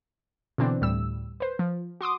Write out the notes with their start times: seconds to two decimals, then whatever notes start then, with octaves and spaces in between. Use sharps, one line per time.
0.58 B2 D3 E3 C4 D4
0.81 D2 A2 G3 E6
1.40 B4 C5
1.59 F3
2.01 F#4 C6 D6 D#6